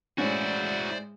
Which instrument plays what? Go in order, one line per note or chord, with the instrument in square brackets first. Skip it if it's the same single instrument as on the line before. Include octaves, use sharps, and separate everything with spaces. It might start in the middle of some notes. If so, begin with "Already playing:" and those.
[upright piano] A2 C#4 [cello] G#3 [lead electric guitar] E4 F#4 [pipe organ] C5 D5